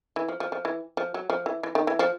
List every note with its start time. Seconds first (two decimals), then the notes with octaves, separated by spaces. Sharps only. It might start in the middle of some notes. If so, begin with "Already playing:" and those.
0.16 E3
0.29 F3
0.40 F3
0.52 F3
0.65 E3
0.97 F3
1.14 F#3
1.30 F3
1.46 E3
1.63 E3
1.75 D#3
1.87 E3
1.99 F3